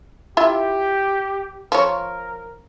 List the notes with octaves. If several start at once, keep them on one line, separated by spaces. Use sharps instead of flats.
E4 F4 G4 E5
F3 A#4 C#5